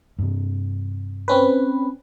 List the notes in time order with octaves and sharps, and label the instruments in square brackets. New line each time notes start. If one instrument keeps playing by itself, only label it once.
[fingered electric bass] G2 C3
[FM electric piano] C4 C#4 B4